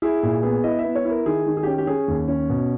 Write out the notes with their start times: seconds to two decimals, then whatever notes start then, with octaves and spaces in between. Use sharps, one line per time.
0.02 E4 G#4
0.23 A#2 G#4
0.43 B3 G#4
0.64 E4 D#5
0.79 E5
0.84 B3
0.95 C#5
1.05 E4
1.10 A#4
1.26 D#3 G#4
1.46 D#3
1.57 G#4
1.63 G4
1.67 C#4
1.78 G4
1.87 C#4 G#4
2.08 D#2
2.28 C#4
2.50 B2